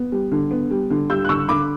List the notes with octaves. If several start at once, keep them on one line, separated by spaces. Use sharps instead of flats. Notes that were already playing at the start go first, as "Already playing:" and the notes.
Already playing: B3
G3
D3
B3
G3
D3
G3 E6 G6
F#6
D3 C#6 E6
D3 B5 D6